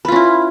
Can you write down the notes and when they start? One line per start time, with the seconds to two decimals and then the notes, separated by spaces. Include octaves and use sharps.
0.05 B4
0.08 F4
0.12 C#4
0.16 E4